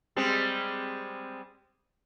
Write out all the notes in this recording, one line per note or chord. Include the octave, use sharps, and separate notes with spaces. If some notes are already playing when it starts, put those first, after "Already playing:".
G3 G#3 C4